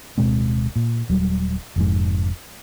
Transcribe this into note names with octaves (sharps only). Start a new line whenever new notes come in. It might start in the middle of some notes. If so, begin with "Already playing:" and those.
D1 B2 G#3 C4
A#2
D#1 F#3 G3
F1 F2 G#2